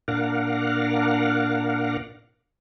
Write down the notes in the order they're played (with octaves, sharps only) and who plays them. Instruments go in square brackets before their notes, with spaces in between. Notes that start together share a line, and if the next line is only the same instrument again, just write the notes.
[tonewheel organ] A#2 D4 A#4 F5 F#5